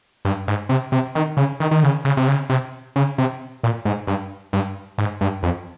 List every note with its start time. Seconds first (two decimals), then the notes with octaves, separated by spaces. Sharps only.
0.25 G2
0.48 G#2
0.69 C3
0.92 C3
1.15 D#3
1.37 C#3
1.60 D#3
1.71 D#3
1.83 C#3
2.05 C#3
2.17 C3
2.28 C#3
2.49 C3
2.96 C#3
3.18 C3
3.63 A#2
3.85 G#2
4.07 G2
4.53 G2
4.98 G#2
5.21 G2
5.43 F2